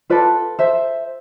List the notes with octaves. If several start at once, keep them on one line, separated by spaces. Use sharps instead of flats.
F4 A4 B4 D5
C5 E5